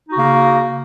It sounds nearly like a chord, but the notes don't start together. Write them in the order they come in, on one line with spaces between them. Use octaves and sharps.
D#4 F#4 C#3 A#3